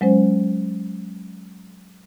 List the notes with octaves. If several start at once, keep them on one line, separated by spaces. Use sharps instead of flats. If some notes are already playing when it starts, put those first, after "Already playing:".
F#3 G#3 C#4 C5